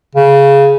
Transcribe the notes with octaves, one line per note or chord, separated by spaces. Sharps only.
C#3